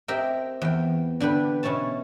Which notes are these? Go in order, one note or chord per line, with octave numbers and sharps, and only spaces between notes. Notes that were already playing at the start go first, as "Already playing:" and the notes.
C4 G4 A#4 D#5 E5 G5
E2 G5
D3 D4 G4 B4
B2 C#4 E4 C#5 A5